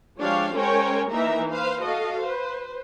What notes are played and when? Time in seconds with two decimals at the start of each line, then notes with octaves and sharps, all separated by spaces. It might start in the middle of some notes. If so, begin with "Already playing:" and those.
0.19 F3 G#3 D4 G4 C#5 F5
0.54 G#3 C#4 A#4 C5 C#5 G5
1.11 E3 A#3 D#4 A#4 E5 A#5
1.52 B4 C5 F5
1.82 F#4 A4 D#5 F5
2.22 B4 C5